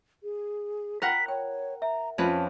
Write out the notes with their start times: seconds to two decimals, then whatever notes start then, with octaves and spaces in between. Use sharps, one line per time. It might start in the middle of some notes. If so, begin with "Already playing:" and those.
0.23 G#4
1.02 F4 A#4 F#5 G5 A#5 B6
1.28 C#5 G5
1.82 E5 A#5
2.18 F2 C#4 B4 A5